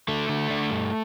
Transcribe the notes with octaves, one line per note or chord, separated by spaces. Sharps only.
D3 A3
D3
D3
G2